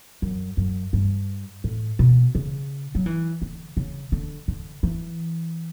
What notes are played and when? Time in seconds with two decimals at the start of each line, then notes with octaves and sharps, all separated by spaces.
0.22 F#2
0.57 F#2
0.93 G2
1.64 A2
1.99 B2
2.35 C#3
2.95 F#3
3.06 E3
3.42 D3
3.77 C#3
4.12 D3
4.48 D3
4.83 E3